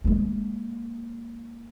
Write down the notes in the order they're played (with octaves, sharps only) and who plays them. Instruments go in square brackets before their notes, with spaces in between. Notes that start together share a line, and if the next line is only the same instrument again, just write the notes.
[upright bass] G#3 A#3